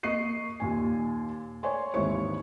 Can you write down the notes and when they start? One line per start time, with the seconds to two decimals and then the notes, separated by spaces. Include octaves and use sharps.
0.03 A#3 D#5 C#6 C7 D#7
0.60 D#2 A#2 G#5
1.63 C#5 D5 G#5 C6
1.94 G#1 D#2 E3 E4 C#5 C#6